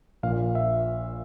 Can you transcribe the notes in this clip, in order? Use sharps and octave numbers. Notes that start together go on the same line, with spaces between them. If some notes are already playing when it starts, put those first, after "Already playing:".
A#1 A#2 F5
E5